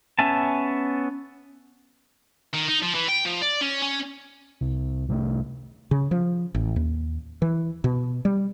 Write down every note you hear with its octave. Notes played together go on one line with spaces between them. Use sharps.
B3 C#4 E5 G#5 A5
D#3
D#4
F3
E3
G5
F3
D5
C#4
C#4
C2
C2 C3 E3 A3
C#3
F3
A1
D#2
E3
B2
G3